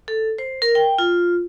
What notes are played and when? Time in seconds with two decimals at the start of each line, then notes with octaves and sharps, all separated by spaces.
0.08 A4
0.38 C5
0.62 A#4
0.75 G5
0.98 F4